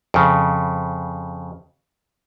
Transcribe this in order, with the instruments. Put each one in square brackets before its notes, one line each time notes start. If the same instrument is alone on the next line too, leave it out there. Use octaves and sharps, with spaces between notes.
[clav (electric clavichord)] F2 C#3